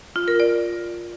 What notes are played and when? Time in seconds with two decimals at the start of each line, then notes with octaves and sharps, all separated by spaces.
0.16 F4
0.28 A#4
0.40 D5